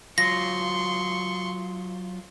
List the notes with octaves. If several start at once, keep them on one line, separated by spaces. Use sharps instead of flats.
F#3 F4 C6 C#6 A#6